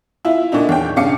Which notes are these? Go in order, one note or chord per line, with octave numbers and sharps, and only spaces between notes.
E4 F4 E5
A#2 D3 D4 D#4
E2 C#5 G5
G2 C#3 C#4 F5 D6 C#7